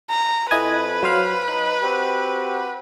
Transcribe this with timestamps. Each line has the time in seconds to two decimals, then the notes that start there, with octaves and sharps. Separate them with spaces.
0.10 A#5
0.51 F2 E4 B4 D#5 G#5
1.03 F#3 C5 F5
1.48 D#4 F#6
1.83 C4 F#4 G4